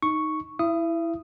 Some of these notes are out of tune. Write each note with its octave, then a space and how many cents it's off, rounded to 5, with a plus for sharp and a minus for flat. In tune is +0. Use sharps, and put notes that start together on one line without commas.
D#4 +0 C#6 +0
E4 +0 E5 +40 D#6 +0